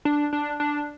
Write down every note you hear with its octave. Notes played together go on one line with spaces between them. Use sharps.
D4
D4
D4